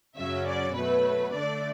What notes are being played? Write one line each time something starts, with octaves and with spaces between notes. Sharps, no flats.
F#2 C#3 F#3 C#4 E5
D5
B2 F#3 A3 B4
D3 A3 D4 D5